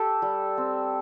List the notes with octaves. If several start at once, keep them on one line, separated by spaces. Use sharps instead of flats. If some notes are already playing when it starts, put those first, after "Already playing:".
Already playing: G4 A4
G3
C4